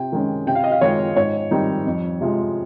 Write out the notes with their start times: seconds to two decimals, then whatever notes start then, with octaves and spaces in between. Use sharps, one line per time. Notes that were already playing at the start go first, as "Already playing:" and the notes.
Already playing: C3 G5
0.12 D#3 G#3 C#4
0.47 C3 G5
0.55 F5
0.64 D#5
0.72 F5
0.81 D#3 G#3 C#5
1.16 G#2 C#5
1.51 D#3 G3 C4 D#4
1.86 F2
2.21 C3 F3 G#3